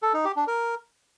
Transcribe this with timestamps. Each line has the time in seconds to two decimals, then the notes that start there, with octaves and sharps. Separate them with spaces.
0.02 A4
0.14 D#4
0.25 G4
0.36 D4
0.48 A#4